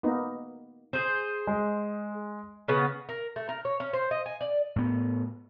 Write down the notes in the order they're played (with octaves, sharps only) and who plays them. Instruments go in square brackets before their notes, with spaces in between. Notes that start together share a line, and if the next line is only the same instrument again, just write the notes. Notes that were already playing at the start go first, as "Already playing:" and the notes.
[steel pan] A#3 B3 D#4
[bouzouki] G#4 C5
[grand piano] G#3
[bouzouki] C#3 B3
A#4
A3
A#4
C#5
C#4
C5
D#5
G#5
D5
[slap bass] A2 B3